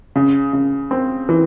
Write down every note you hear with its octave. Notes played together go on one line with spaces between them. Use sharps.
C#3
C#3
C4
E3